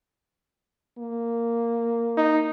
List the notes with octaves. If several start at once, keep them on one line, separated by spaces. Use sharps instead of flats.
A#3
D#4